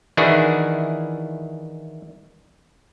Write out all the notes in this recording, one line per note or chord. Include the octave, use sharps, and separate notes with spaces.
D#3 E3 D4 E4 F#4 G#4